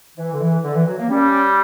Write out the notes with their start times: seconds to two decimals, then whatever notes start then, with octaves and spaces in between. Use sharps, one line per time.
0.17 E3
0.33 D3
0.40 E3
0.63 D3
0.75 E3
0.86 F#3
0.98 A#3
1.09 G3 C#4